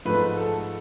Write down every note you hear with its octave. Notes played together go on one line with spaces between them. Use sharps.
G#2 F3 A3 B4
A4